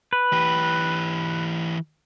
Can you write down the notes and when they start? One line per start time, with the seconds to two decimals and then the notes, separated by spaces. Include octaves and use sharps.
0.13 B4
0.33 E3 G4